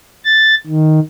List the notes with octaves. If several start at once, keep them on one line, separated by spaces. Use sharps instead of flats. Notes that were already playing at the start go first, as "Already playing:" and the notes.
A6
D#3